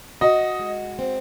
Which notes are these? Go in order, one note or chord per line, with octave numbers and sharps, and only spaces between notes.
F#4 D#5
G#3
C4